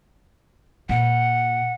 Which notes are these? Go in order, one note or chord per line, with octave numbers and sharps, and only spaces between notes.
A#2 F#5